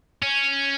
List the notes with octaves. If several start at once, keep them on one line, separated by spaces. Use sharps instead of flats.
C#4